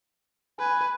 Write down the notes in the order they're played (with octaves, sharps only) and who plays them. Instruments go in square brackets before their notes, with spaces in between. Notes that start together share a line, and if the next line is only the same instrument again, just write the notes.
[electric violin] B4 [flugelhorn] G#5